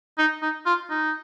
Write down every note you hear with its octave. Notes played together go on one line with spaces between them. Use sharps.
D#4
D#4
F4
D#4